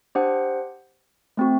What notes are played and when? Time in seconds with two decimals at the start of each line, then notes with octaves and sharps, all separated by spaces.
0.15 D4 G4 C5 F#5
1.37 A3 C4 F#4